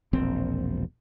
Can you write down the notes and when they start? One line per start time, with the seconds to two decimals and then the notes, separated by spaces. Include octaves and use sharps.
0.13 E1 A#1 C4